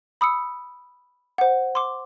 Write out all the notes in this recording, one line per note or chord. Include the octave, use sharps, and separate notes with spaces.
B5 D#6 E6 C#7
C5 F#5
C6 D6